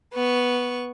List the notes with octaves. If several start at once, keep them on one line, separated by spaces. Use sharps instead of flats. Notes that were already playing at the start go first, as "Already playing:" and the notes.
B3 C#6